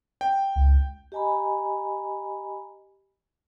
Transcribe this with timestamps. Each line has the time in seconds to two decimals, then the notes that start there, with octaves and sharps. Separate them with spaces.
0.21 G5
0.56 C#2
1.12 G4 D#5 G#5 A#5 B5